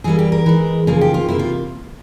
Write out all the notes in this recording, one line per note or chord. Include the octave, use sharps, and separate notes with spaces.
E3 G3 A#3 G#4
G4
A#4
E3 G#3
C#3 F3 A#3 G#4
G4
F4
C3 G3 A#3 E4
F4